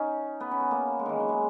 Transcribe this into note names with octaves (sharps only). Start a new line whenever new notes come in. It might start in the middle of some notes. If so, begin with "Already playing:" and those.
Already playing: C#4 D#4
B3
C#4
B3
A#3
G#3
D#3 E3
F#3
G#3